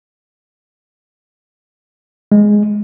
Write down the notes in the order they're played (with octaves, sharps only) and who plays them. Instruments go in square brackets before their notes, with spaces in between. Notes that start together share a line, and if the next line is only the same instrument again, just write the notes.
[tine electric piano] G#3